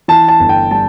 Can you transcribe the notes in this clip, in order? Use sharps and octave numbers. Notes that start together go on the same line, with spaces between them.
E3 A5
A5
G1
G5
G3 A5